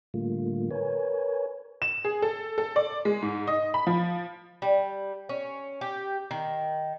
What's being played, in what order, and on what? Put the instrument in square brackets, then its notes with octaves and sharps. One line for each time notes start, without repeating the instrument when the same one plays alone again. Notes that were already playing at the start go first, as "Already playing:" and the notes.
[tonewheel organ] A2 D3 G3 A3 A#3 F4
A#4 B4 C#5 G#5
[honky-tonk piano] E7
G#4
A4
A4
D5
G#3
G#2
D#5
B5
F3
[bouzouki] G3
C#4
G4
D#3